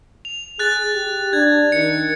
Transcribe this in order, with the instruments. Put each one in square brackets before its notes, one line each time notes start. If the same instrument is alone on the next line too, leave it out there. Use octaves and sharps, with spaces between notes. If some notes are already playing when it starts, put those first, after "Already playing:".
[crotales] F7
[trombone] G#4 [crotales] F#6 A6
[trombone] G4
[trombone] D4 [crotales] G#6
[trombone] D#3 [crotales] C#7